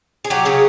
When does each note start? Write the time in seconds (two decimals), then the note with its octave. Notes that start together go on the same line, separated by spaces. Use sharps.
0.25 G#4
0.30 F#3 G4
0.45 C#3 G#4